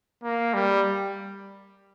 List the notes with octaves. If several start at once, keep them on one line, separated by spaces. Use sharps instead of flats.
A#3
G3